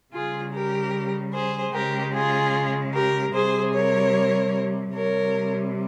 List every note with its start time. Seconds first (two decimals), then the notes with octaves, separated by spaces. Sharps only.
0.13 C#3 G3 F4 G#4
0.53 G4 A#4
1.33 G#4 C5
1.73 C#3 G#3 G4 A#4
2.13 F4 G#4
2.94 G4 A#4
3.33 C3 G3 G#4 C5
3.73 A#4 C#5
4.94 C3 G3 A#4 C#5